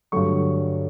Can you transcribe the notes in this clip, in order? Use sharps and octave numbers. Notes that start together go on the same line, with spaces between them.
G2 D3 F#3 A3 C#6